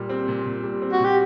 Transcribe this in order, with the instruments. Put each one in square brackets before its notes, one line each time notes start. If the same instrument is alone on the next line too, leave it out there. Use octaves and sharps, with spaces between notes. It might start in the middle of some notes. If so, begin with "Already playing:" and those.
Already playing: [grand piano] A#2 G3
C4
A#2
A#2
G3
C4
[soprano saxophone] F#4
[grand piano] A#2
[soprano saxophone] G4